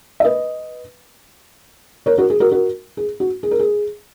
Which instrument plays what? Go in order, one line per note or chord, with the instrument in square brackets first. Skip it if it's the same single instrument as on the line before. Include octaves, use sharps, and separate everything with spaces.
[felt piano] E5
B4 D#5
A#4 C#5
F#4 A#4
G#4
F#4 A#4
F#4 A#4
G#4
F#4
G#4
A#4
G#4